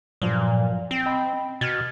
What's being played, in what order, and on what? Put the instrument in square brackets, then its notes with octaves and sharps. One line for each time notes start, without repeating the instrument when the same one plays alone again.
[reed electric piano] G2 F3 F#3 [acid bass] A#2
[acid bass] C4
[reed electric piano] D#5 G5 B5
[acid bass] B2 [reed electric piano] F6 G#6 A6